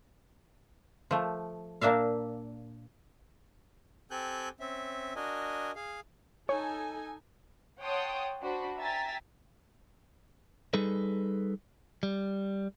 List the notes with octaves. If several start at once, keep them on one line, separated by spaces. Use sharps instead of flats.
F3 A3
A#2 A#3 D4 E5 F5
C4 G4 A4 G#5 F#6 G6
C4 C#4 E5
D4 F#4 A#4 D#5 G#5
G#4 F5
D#4 A4 C#5 G#5
C#5 F#5 G5 A5 C6 D#6
D4 F#4 C5 B5
E5 G5 G#5 A#5 A6 B6
G3 D#4 G#4 A4 B4
G3